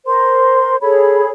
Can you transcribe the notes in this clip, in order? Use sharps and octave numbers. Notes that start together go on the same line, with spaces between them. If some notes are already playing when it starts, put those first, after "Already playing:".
A#4 C5 C6
G#4 A4 C#5 B5